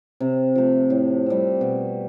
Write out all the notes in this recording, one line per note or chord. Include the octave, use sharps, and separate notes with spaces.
C3
F3 A3
A2
G3 C4
B2